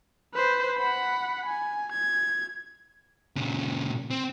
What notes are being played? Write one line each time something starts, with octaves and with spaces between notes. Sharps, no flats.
B4 C5
F#5 B5
G#5
G#6
A#2 C#3
C4